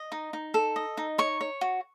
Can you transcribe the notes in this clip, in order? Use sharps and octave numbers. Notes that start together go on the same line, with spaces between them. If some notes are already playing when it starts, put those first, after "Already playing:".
Already playing: D#5
D#4
D#4
A4
D#5
D#4
C#5 C#6
C#5
F#4